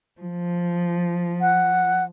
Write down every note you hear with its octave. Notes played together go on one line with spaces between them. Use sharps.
F3
F#5